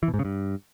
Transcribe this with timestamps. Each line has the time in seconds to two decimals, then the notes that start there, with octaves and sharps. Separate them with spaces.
0.03 E3
0.08 B2
0.14 G#2
0.19 C#3
0.25 G2